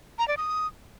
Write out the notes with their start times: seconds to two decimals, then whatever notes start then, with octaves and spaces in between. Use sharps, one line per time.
0.19 A#5
0.28 D5
0.37 D#6